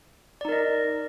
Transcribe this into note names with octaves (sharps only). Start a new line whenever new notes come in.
D#4 A#4 D5 D#5